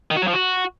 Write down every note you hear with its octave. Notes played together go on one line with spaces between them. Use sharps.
D#3
F#4
F#3
F3
F#4